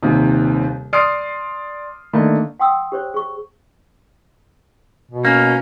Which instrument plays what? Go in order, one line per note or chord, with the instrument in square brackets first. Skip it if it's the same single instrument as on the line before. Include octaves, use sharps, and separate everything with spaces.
[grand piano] D#1 D#2 C3
D5 C6 D#6 F6 C7 D7
D3 D#3 A3 A#3 D4
[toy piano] F#5 G5 C6 D#6 E6
G4 C5 C#5
G#4 C#6
[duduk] B2
[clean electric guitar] A#3 [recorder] C#4